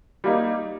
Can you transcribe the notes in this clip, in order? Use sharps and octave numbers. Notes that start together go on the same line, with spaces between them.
G3 A#3 D#4